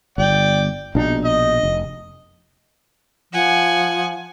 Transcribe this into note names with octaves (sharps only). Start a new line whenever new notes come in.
G1 D5 G5
A#1 B2 D4 D#4
D#5
F1
F3 F#5 G#5